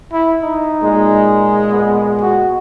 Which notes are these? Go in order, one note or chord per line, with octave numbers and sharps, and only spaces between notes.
E4
D#4
A#2 G#3
B3
F#4